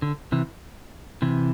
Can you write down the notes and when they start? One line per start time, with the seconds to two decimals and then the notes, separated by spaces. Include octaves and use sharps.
0.02 D3
0.32 C3 E3
1.22 C3 E3